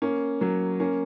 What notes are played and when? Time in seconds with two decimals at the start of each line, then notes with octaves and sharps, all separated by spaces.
0.02 A#3 C#4
0.41 F#3 A#3
0.80 A#3 C#4